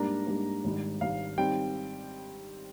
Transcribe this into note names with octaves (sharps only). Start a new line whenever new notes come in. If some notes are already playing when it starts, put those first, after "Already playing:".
Already playing: G#2 G3 A#3 D4 A#5
G#2 G3 A#3 D4
G#1 G#2 G3
G#1 G#2 G3 F5
D#3 G3 C4 G5